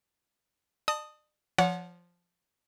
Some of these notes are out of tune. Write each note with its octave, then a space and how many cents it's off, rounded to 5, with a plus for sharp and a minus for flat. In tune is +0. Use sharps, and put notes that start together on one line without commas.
D5 +45 A5 +0 D#6 +0
F3 +0 C#5 +35 F#5 -20